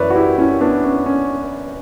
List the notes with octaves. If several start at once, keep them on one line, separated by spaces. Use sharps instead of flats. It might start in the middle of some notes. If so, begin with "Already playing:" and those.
Already playing: F#2 E3 B4 C#5 D5 E5
F#4
E4 G4
C#4 E4
B3 D4
C#4
C#4